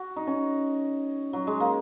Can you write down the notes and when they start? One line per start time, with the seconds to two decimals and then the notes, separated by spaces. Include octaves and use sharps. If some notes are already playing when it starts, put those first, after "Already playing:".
Already playing: F#4
0.16 D#4
0.27 C#4
1.33 F#3
1.47 G#3
1.60 A#3